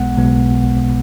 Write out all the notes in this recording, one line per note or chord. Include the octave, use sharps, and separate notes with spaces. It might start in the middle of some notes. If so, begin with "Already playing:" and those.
Already playing: B1 B2 G#3 B3 F#5
B1 B2 G#3 B3